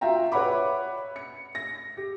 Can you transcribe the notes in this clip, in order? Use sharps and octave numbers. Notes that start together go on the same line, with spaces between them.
F4 F#4 E5 G5 A#5
B4 C#5 E5 F#5 B5 D6
C#7
A#6
G4